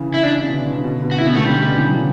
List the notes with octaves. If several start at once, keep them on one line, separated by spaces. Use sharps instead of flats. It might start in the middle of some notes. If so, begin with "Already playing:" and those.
Already playing: C#3 E3
E4
D4
C#3
B2 D3
B2 D3
C#3
B2 D3
B2 D3
F#4
C#3 E4
B3
B2 A3
D3 G3
C#3
B2 D3
C#3 E3
D3 F#3